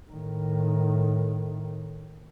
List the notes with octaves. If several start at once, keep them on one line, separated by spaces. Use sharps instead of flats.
A2 D#3